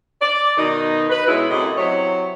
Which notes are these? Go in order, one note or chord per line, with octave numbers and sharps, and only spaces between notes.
D5
B2 D#3 D#4
B4
B2 G#3 C#4 E4
F#2 A2 C3 D#5
C3 F#3 E4 C#5